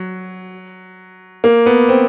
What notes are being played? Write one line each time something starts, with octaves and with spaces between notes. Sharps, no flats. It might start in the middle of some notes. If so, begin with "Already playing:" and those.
Already playing: F#3
A#3
B3
C4